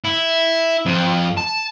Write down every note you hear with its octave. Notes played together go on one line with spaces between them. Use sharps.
E4
F2
A5